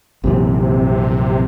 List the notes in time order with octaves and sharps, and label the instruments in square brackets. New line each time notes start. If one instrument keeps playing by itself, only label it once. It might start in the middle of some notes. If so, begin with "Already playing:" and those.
[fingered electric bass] A#1 F#2 E3 [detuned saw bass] C3